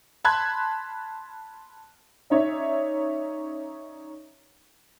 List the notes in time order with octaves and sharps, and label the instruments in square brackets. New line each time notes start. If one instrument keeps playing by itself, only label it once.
[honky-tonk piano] A5 B5 C6 F#6 G#6
C#4 D#4 C#5 D5 E5